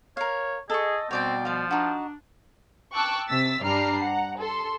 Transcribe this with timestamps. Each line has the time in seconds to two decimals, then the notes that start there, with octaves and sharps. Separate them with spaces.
0.17 A#4 C#5 F5
0.70 G#4 A4 D#5 C#6
1.11 B2 G3 B3 C4 C#5 D5 G5
1.45 F3 F4 D5
1.71 D4 D#4 F#4
2.93 G5 A5 C#6 D6 E6 F#6
3.28 C3 E6 A6 B6
3.63 G2 G3 D4 A#5 F6 C7
4.03 F#5 A#5
4.39 A4 C6